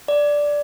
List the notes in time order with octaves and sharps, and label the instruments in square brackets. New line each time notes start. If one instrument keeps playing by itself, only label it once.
[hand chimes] D5